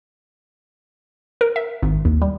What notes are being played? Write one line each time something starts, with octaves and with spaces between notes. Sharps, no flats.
A#4
E5
G#1
D#2
G3